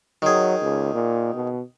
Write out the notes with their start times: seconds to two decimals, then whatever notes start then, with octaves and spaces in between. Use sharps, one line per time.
0.22 D#3 F#3 G#4
0.62 C#2
0.94 A#2
1.34 B2